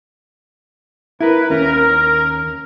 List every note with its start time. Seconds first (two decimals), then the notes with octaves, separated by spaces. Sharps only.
1.21 E4 A#4 B4
1.51 D#2 C#4 A#4